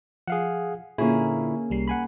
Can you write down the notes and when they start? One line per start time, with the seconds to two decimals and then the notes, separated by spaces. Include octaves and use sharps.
0.28 F3 G#4 F5 F#5
0.98 A#2 D3 A#3 C#4 E4 F4 G#4
1.70 C2 G3 C7
1.88 F#5 G#5 B5